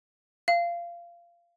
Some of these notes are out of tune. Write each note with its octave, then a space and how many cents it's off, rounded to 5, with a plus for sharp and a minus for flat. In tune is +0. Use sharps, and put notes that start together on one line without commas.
F5 -20